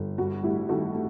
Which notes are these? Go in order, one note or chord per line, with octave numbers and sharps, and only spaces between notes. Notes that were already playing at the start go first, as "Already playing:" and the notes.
Already playing: G1
G2 F#4
A1 E4 G4
D#3 F#4 A4
A3